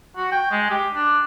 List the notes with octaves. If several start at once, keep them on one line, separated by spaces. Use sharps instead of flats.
F#4
G5
G#3
G4
D4